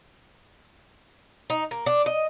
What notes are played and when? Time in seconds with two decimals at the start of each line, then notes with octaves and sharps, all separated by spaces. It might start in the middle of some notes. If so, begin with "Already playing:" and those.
1.50 D#4
1.71 A#3
1.86 D4
2.06 D#5